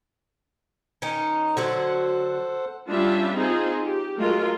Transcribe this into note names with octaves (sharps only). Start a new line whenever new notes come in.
D#3 C#4 D#4
D3 F#3 F#4 A4 C5 F#5
G3 C#4 D4 F4 E5
C4 D#4 F4 G#4
G4
F#3 G#3 A3 F4 A#4